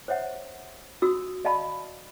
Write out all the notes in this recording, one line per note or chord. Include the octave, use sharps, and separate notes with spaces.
C5 C#5 E5 F#5
F#4 D#6 E6
D5 D#5 F5 A5 B5 C6